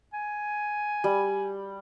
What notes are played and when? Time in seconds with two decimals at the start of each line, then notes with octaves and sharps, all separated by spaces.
0.13 G#5
1.04 G3